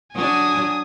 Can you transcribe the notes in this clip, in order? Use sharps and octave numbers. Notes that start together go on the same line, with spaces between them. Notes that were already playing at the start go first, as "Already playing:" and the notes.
F#3 D4 G#5 D#6